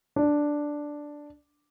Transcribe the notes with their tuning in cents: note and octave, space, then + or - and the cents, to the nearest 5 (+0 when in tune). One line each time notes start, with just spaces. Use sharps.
D4 +0